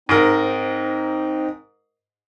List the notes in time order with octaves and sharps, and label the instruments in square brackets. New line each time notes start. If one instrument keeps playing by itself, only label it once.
[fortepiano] G#2 A#4 [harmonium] C4 D#4